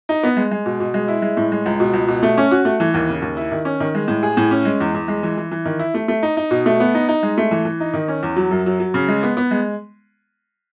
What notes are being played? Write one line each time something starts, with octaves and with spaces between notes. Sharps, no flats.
D#4
B3
G#3
G#3
B2
B2
G#3
E4
G#3
A2
G#3
C#2
B2
C#2
B2
A3
C#4
F#4
A3
E3
D#2
C#3
D#2
E4
D#3
C#4
D#3
G#3
A2
G#4
A2
C#4
G#3
E2
E2
G#3
E3
E3
E3
D#3
E4
A3
A3
D#4
D#4
B2
A3
B3
D#4
D#4
G#3
A3
E3
E3
D#4
D#3
C#4
E2
F#3
F#2
F#3
F#3
C#3
G#3
B3
B3
G#3